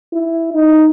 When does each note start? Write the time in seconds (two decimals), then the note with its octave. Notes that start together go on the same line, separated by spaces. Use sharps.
0.13 E4
0.53 D#4